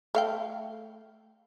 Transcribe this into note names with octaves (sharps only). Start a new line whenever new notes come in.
A3 F5 G5